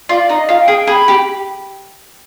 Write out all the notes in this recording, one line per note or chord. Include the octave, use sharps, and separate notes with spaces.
F4 D5
D#4
D#5
F4
G5
G#4
G#4 B5
G4